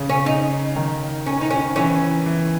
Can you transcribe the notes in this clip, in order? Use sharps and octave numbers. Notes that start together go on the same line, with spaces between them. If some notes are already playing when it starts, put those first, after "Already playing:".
Already playing: C#3
C#4
D#4
D#3
C#4
D#4
C#4
E3 C#4
E3